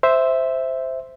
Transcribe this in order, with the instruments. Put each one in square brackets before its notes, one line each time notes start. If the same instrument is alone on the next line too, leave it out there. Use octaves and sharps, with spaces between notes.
[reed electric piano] C5 E5